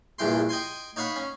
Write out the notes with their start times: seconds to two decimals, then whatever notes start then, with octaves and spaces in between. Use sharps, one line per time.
0.18 A#1 E2 G2 E3 G5 C6
0.49 D#5 G5 G#5 C6
0.96 D#4 C#5 F5 F#5 B5
1.16 C#4